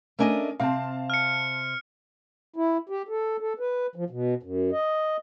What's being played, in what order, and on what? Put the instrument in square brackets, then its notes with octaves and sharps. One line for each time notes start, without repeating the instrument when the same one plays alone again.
[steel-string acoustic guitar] A3 D4 D#5 [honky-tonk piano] C#4 A#4 G#5
[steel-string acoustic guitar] C3 C4 [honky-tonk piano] F5 A5
[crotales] F6 C#7
[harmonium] E4
G4
A4
A4
B4
F3
B2
F#2
D#5